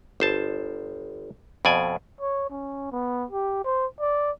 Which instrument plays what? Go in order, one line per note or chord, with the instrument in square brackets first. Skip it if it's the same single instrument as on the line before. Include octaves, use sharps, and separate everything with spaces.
[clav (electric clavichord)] G1 C5 A5
F2 B2 D5 G#5
[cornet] C#5
C#4
B3
G4
C5
D5